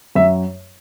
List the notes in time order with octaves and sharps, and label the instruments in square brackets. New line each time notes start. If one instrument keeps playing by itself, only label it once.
[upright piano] F#2 E5